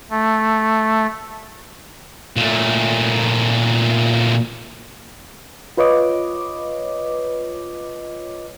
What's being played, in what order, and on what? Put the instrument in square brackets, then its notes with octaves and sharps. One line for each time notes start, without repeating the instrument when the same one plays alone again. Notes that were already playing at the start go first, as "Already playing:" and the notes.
[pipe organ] A3
[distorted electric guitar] A#2 A3
[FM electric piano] F4 B4 C#5 D#5 D6